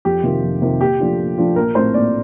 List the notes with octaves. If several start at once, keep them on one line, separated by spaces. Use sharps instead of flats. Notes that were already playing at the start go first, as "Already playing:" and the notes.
F2 G4
C3 D#3 A#3 F4
F2
C3 D#3 A#3 F4
A#2 G4
F3 A3 D4 F4
A#2
F3 A3 D4 F4
A#1 A#4
A2 A3 C4 C5
A#1 D5